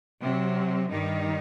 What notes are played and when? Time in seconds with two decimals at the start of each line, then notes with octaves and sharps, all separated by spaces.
0.21 C3 F#3 C4
0.88 G2 D#3 G3 D#4